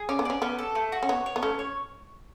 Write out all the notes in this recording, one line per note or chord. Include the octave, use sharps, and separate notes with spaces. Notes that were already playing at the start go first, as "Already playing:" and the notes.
Already playing: G#4
C#4 D5
B3
C#4 D5
B3 C#4
A4
A3
F#4
C#4
B3 C#5
C#5
B3
A3 C#4
C#5